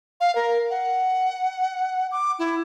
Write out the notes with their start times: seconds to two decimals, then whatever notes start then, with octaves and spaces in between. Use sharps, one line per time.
0.20 F5
0.35 A#4
0.70 F#5
2.12 D6
2.39 E4